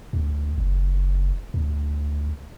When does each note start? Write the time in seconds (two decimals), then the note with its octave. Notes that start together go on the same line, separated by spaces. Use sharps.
0.13 D2
0.58 F#1
1.54 D2